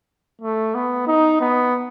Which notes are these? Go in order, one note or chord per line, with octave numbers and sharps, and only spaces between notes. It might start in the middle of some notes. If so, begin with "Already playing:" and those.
A3
B3
D#4
B3